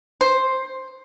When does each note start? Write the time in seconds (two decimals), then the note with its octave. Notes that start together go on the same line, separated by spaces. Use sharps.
0.21 C5